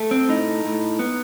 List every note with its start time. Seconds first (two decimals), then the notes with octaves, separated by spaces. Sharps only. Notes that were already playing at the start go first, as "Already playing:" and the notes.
Already playing: A3
0.11 C4
0.29 A2 D#4
0.65 A2
0.99 B3